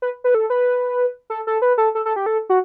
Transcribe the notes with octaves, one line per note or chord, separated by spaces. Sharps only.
B4
B4
A4
B4
A4
A4
B4
A4
A4
A4
G4
A4
F#4